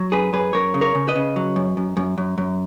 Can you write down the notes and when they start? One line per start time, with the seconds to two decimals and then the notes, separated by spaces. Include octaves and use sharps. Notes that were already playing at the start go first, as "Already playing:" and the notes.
Already playing: F#3
0.12 F#2 G#4 B4
0.33 F#2 G#4 B4
0.53 F#2 A#4 C#5
0.74 C#3
0.81 A#4 C#5
0.95 C#3
1.08 B4 D#5
1.16 C#3
1.36 F#3
1.56 F#2
1.77 F#2
1.97 F#2
2.18 F#2
2.38 F#2